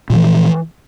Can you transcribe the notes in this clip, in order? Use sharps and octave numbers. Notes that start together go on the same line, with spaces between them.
A#2 E3 F3